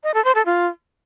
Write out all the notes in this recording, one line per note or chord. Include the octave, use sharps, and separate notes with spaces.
D#5
A4
C5
A4
F4